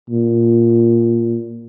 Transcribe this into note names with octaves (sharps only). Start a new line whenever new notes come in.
A#2